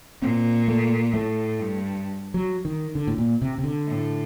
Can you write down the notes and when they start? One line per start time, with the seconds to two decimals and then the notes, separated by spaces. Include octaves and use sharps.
0.22 A#2 C4
0.68 A3
1.13 A2 A3
1.59 G2
2.34 F#3
2.65 D#3
2.95 D3
3.07 A2
3.18 A#2
3.42 C3
3.58 C3
3.64 D3
3.87 A2